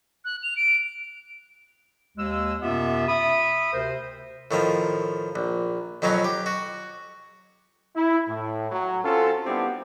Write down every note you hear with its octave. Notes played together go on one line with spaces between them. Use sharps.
F#6
F7
D7
D#2 G#3 E6
F#2 C3 B3 F4 G4 E5
E5 B5 D#6
D2 C3 A#4 C5
A2 D#3 F3
A#1
F2 B2 F#3 C#4 D#4
G4
F#4
E4
A2
F#3
C4 C#4 F4 F#4 A4
G3 B3 C4 D4 E4 G4